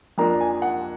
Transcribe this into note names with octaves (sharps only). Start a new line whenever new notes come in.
F2 F3 A#3 D4 A#5
G#5
F#5